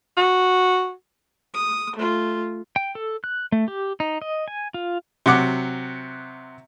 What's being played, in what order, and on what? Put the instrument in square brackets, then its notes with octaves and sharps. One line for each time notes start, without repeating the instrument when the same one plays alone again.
[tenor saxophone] F#4
[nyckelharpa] D#6
A3 F4
[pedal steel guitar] G5
A4
F#6
A3
G4
D#4
D#5
G#5
F4
[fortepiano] C3 F#3 F#5 D6